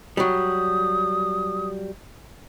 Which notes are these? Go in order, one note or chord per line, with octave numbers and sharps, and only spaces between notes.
F#3 G3 D#6